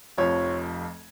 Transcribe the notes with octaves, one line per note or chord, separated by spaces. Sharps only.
F1 F2 F3 C#5